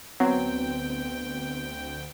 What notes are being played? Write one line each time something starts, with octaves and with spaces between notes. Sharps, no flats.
D2 F#3 B3 C4 G5